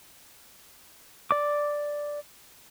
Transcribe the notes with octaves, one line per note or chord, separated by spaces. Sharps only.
D5 D6